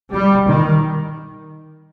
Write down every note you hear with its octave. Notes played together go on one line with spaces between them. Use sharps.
G3
D#3